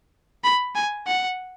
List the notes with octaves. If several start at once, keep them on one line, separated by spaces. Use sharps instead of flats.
B5
G#5
F#5